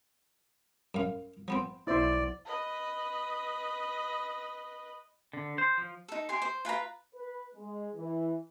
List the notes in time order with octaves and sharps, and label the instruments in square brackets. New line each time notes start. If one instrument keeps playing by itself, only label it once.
[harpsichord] F#2 F5
F3 B3 C4
[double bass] B1 [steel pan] E4 C5 E5 [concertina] D5
[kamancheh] B4 D#5
[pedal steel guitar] D3
C5
F3
[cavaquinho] D#4 A4
G4 G#5 C6
C5
F4 B4 G#5 A#5
[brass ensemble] B4
G#3
E3